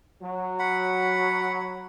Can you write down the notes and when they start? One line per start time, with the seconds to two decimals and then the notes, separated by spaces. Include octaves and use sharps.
0.22 F#3
0.59 F#5 B5